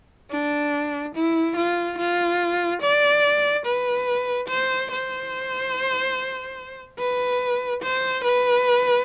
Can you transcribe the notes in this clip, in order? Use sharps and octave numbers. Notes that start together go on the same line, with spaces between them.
D4
E4
F4
F4
D5
B4
C5
C5
B4
C5
B4